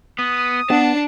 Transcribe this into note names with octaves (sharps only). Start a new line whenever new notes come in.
B3 D#6
B3 D4 B4 F#5 A5